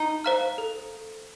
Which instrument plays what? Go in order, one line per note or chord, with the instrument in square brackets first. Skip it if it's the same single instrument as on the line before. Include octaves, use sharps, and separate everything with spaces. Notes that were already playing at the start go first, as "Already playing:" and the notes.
Already playing: [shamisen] D#4
[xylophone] C5 F5 A#5 F6
A4